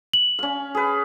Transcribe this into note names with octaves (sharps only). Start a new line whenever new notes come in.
F#7
C#4 F5
G#4 B4